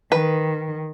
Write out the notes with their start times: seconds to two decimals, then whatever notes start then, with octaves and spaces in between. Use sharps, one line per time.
0.12 D#3 B4